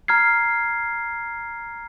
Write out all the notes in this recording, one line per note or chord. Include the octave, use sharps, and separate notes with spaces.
A#5 F6 G#6 C7